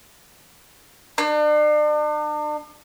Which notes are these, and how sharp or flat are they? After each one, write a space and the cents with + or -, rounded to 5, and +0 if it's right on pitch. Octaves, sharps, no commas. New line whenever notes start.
D4 +40